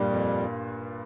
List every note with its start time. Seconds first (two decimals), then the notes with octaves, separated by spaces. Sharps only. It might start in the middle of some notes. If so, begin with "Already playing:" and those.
Already playing: G2 A#2 G3
0.09 F2